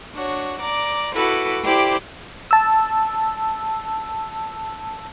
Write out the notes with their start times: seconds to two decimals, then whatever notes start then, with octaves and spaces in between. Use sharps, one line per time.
0.14 D4 F#4 C#5
0.60 D5 A#5 D6
1.14 E4 F#4 A4 B4 B5 D6
1.64 E4 G4 C5 D5 G5 D6
2.51 A5 E6